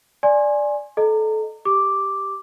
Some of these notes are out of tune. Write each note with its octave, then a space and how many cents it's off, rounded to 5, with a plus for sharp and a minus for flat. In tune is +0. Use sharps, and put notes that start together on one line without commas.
D5 +0 G#5 +0 C6 +30
A4 -20 D#5 -5 A#5 -30
G4 +0 D6 +0